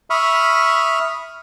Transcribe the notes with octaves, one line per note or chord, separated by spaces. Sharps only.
E5 B5 C#6 D#6 F6